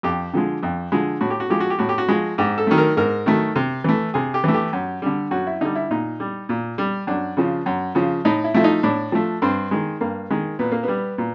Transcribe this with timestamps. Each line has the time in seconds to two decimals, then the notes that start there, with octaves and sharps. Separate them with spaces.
0.03 F2 G4
0.33 D3 F3 G#3
0.63 F2
0.92 D3 F3 G#3
1.21 A2 F#4
1.30 G4
1.40 F#4
1.50 F3 G#3 G4
1.60 F#4
1.70 G4
1.79 A2 F#4
1.89 G4
1.98 F#4
2.08 F3 G#3
2.38 G#2 G4
2.58 A4
2.67 D#3 F#3 A3
2.78 A#4
2.97 G#2 A#4
3.26 D#3 F#3 A3
3.56 C3
3.84 E3 A3
4.14 C3 G#4
4.34 G4
4.44 E3 A3
4.54 G4
4.73 F#2
5.02 D3 G3
5.31 F#2 F#4
5.47 E4
5.61 D3 G3 D#4
5.75 E4
5.91 A#2 D#4
6.20 G3
6.49 A#2
6.78 G3
7.07 F#2 D4
7.37 C#3 F3
7.66 F#2
7.95 C#3 F3
8.25 A2 D#4
8.44 E4
8.54 F3 A3 E4
8.64 D#4
8.83 A2 D4
9.12 F3 A3
9.42 G2 C4
9.71 D#3 G#3
10.01 G2 A#3
10.30 D#3 G#3
10.59 A#2 B3
10.72 A#3
10.83 B3
10.88 G3
11.18 A#2